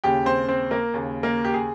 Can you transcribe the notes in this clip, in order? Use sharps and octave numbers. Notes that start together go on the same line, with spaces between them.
D#2 C#3 G4 G5
C4 C5
C4 C5
A#3 A#4
D#2 C#3
A#3 A#4
G4
G#4